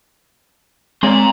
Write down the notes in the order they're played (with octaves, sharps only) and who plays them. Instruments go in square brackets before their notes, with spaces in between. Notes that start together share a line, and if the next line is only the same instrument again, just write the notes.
[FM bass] G#3 [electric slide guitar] C4 C#5 D5 [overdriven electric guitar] A#5 C6